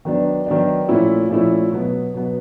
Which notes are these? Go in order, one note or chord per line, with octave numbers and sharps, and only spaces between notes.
D#3 F#3 B3 D4
D#3 F#3 B3 D4
A#2 F3 A3 C#4 E4
A#2 F3 A3 C#4 E4
B2 F#3 B3
B2 F#3 B3